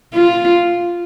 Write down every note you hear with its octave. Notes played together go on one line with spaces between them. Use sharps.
F4